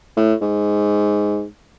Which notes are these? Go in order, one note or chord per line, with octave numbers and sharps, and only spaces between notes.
A2
G#2